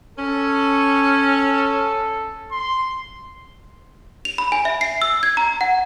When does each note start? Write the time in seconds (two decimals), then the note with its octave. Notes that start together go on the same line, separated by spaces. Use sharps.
0.17 C#4 A4
2.51 C6
4.25 F7
4.38 B5
4.52 G#5
4.65 E5
4.81 C7
5.02 E6
5.23 G#6
5.37 A#5
5.61 F#5